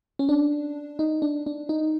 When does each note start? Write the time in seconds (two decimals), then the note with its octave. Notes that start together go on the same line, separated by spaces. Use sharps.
0.19 C#4
0.29 D4
0.99 D#4
1.22 D4
1.46 D4
1.69 D#4